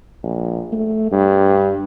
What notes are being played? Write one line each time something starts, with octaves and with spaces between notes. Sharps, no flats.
A#1
A3
G2